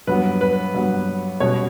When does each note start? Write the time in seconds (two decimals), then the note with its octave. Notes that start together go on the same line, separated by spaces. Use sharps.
0.07 G2 F#3 B3 B4
0.41 B4
0.74 G2 F#3 B3
1.40 B2 G3 C#4 C#5